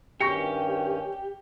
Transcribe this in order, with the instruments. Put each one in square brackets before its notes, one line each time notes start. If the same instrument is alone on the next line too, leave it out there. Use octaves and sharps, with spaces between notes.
[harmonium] G2 D#3 C#4 [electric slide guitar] G4 [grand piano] C#6 A#6 C#7